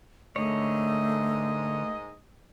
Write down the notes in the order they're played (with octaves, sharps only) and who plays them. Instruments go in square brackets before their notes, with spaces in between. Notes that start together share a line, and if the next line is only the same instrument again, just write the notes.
[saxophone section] G#2 A#3 D#5 [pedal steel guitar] D3 C#5 [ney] A3